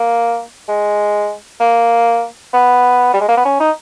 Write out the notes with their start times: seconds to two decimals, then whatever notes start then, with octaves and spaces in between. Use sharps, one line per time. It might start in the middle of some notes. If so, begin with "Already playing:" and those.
Already playing: A#3
0.69 G#3
1.60 A#3
2.54 B3
3.14 G3
3.21 G#3
3.29 A#3
3.37 B3
3.45 C#4
3.60 D#4